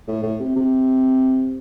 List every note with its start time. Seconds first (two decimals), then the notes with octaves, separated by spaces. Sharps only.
0.07 A2
0.23 A2
0.40 C3
0.56 C3